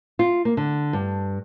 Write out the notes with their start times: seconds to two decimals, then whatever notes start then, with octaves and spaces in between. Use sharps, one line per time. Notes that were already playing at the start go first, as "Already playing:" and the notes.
0.19 F4
0.45 A#3
0.57 D3
0.93 G2